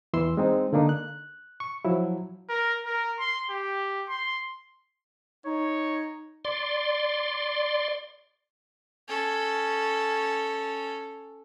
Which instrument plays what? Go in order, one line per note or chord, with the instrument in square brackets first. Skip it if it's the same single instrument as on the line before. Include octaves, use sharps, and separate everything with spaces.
[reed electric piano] E2 E3 E4 C6 E6
G#3 C4 D#4
D3 A#3 D4 D#4
F#6
C#6
F3 F#3 E4
[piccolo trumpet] A#4
A#4
C6
G4
C6
[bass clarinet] D#4 [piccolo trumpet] C#5
[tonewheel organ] D5 C6
[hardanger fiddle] C#4 A4